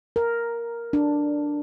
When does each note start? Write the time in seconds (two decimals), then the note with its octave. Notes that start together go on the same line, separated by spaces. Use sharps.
0.16 A#4
0.93 D4